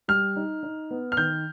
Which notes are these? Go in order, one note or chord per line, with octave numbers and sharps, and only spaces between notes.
G3 F6
D#4
D#4
B3
F6
D#3 G6